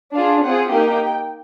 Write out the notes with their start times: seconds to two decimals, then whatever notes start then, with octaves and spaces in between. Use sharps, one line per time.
0.14 D4 F4 G#4 F5
0.43 C4 F4 G#4 F#5
0.70 A#3 D#4 G4 G5